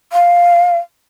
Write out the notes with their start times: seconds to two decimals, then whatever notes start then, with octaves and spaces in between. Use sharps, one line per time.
0.12 F5